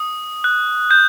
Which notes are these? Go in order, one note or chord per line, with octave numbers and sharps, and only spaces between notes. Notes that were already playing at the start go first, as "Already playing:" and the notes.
Already playing: D#6
F#6
G6